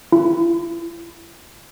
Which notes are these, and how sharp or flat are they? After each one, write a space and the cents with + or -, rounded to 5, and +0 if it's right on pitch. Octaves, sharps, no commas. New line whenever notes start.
E4 +40